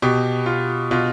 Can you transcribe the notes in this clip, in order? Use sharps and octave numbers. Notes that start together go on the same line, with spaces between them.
B2 G4
F4
B2 F4